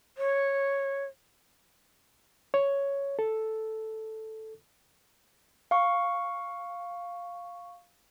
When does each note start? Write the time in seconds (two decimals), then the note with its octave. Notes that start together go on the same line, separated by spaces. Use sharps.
0.18 C#5
2.54 C#5
3.19 A4
5.71 F5 C#6